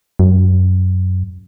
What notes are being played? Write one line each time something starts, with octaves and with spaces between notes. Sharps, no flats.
F#2